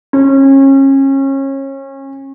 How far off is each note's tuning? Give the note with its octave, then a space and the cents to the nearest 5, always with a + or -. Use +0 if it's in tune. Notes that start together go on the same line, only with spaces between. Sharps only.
C#4 -30